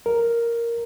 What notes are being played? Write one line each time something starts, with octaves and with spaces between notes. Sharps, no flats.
A#4